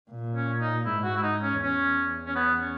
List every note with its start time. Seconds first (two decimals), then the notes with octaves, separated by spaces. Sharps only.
0.11 A#2
0.35 C#4
0.60 D#4
0.86 G#2 E4
1.04 F#4
1.17 E4
1.23 D#4
1.42 C#4
1.60 E2 C#4
2.27 C#4
2.36 B3
2.61 C#4